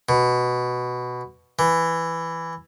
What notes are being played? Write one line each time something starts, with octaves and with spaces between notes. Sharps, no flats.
B2
E3